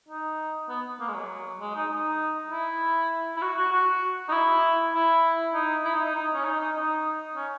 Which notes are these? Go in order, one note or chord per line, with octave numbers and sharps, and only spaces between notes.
D#4
B3
A#3
G#3
F#3
G#3
D#4
D#4
E4
E4
F#4
F#4
F#4
D#4
E4
E4
D#4
E4
D#4
D#4
D#4
C#4
D#4
D#4
D#4
C#4